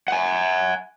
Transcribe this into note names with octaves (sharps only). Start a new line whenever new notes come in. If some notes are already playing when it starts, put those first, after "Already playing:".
F#5 G#5